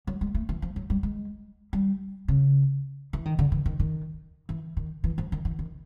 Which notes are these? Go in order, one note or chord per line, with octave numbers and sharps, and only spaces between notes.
F#3
G#3
A3
E3
F3
F#3
G3
G#3
G3
C#3
E3
D#3
D3
E3
D#3
D#3
E3
D#3
E3
F3
D#3
E3
D#3